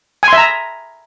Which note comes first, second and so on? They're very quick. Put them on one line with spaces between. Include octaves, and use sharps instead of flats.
G#5 C6 E5 A#5